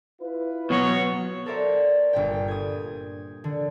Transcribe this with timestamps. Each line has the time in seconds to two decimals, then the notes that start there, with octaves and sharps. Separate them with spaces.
0.21 E4 F4 B4
0.70 B2 F#3 C#5
1.46 A4 A#4 C5 D5 E5
2.13 G1 A#2 G5
2.48 D#6 G#6
3.44 D3